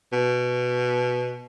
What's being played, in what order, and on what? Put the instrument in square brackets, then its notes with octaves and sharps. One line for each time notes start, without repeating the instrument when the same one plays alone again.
[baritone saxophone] B2